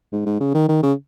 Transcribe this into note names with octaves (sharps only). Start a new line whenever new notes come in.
G#2
G#2
C#3
D#3
D#3
C#3